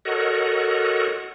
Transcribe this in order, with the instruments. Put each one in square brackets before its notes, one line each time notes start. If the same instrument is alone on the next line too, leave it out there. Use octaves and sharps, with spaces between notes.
[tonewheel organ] F#4 A4 A#4 C#5 D#5 F#5